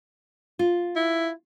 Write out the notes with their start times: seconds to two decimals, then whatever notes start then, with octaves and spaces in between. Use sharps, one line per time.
0.59 F4
0.96 E4